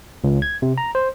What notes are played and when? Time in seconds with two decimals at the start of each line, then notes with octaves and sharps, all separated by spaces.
0.24 C#2
0.42 G#6
0.62 C3
0.78 A#5
0.95 C5